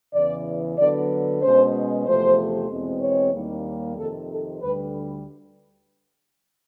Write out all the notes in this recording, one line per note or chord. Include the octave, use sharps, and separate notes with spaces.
E2 C#3 E3 D5
D3 F#3 B3 D5
B2 G#3 C#4 C5
E2 C3 F3 A3 C5
E2 B2 G#3 C4
C#5
D#2 D#3 G3 A#3
F2 C3 D#3 A4
A4
D2 D3 G3 B4